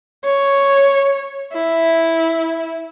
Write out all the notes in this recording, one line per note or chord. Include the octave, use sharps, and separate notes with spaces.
C#5
E4